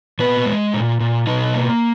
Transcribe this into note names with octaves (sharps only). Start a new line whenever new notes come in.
A#2 B3 B4
G#3
A#2
A#2
B2 D#4
A#3